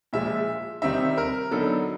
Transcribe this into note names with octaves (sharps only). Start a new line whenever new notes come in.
A#2 F3 G#3 E5
C3 D#3 G3 C4 D#4 E5
A#4
D3 F#3 B3 D#4 A4